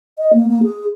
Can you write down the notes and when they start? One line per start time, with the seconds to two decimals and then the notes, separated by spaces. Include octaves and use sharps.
0.19 D#5
0.33 A#3
0.48 A#3
0.63 G#4